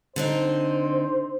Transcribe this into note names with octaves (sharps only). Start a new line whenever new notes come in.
D3 C4 D#4 C5